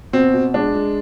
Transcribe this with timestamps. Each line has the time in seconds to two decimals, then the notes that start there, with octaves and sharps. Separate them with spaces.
0.13 B2 C4
0.33 B2
0.54 G#3 D4
0.75 G#3